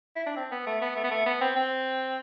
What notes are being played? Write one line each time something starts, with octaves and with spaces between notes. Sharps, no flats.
E4
D4
C4
B3
A3
B3
A3
B3
A3
B3
C4
C4